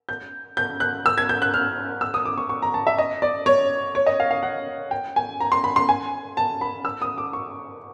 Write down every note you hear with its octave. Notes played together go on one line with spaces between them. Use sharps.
G6
G6
F#6
E6
G#6
G6
F#6
F6
E6
D#6
D6
C#6
C#6
A#5
A5
E5
D#5
D5
C#5
C#5
D#5
F5
F5
F#5
G5
G#5
A#5
C6
B5
C6
G#5
A5
B5
E6
D#6
D6
C#6